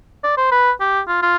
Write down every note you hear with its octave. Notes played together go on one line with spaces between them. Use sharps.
D5
C5
B4
G4
F4
F4